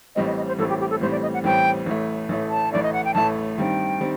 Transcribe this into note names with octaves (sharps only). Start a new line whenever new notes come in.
A1 A2 G3 C4 D#5
D#5
D#5
C5
A1 A2 G3 C4 A4
G4
G4
A4
A1 A2 G3 C4 C5
D5
D#5
F#5
A1 A2 G3 C4 G5
A1 A2 A3
A1 A2 A3
A5
A1 A2 A3 D5
D#5
F#5
G5
A1 A2 A3 A5
G2 D#3 G3 C4 G5
D#3 G3 C4